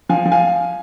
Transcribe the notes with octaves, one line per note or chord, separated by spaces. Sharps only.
F3 F5 G#5
F3
F5 G#5